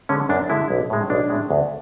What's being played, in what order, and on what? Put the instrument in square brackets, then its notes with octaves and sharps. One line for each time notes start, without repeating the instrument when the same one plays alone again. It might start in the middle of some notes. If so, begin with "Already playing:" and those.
[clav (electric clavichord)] D3 G#3 C#4
F#2 D4
D3 G#3 E4
B1
A2 G#3
B1 D4
A2 G#3
D2